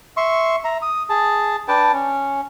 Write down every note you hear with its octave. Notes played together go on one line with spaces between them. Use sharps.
E5 C6 C#6
E5 A#5
D#6
G#4 A5
D4 B4 G5 A5
C#4